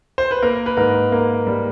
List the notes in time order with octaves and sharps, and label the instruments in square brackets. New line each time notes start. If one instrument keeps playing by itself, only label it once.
[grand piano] C5
B4
A#3 A#4
B4
G#2 A#4
A#3
G3